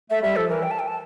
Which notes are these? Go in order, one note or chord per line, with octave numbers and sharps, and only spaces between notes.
A3 E5
G3 E5
F3 A4
E3 A#4
G5
A5
G5
A5